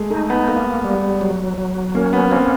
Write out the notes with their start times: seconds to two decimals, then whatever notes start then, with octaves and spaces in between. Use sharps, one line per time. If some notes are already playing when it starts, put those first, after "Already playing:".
Already playing: G#3 A3
0.10 A3 D#4
0.30 B3
0.48 A3 A#3
0.84 G3
1.21 F#3
1.58 F#3
1.95 A#3 C#4
2.13 B3
2.32 A#3 C4